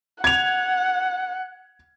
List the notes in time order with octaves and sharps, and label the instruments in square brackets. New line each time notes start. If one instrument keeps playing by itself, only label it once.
[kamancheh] F#5 [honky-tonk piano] G#6 F7